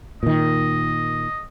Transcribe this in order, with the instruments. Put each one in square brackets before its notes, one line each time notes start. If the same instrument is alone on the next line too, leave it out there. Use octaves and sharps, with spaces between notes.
[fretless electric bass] A#2 D#3 [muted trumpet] D#5